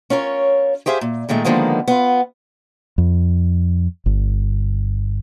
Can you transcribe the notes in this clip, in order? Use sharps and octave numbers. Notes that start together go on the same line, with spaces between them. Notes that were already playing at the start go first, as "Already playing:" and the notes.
C#4 F4 A#4 C#5
G4 G#4 C5 E5 F5
A#2
A#2 D#3 G#3 A3
D3 D#3 F3 G#3 A#3 B3
B3 F4
F2
G1